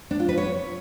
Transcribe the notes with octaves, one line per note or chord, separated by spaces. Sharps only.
D4
F4
B4
C#5